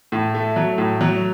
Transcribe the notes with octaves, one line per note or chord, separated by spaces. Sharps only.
A2
A3
F#3
A2
F#3